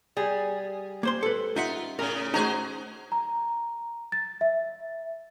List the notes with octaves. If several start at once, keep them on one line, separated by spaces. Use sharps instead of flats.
G3 G#4
A#3 C5 C6
A4 B4
D#4 F4 E5 F#5
A2 C#3 A#4
A3 D#4 F#4 G#4 C5 A#5
A#5
A6
E5